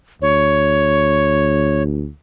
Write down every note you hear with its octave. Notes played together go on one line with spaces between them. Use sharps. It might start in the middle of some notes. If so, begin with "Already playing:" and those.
D2 C#5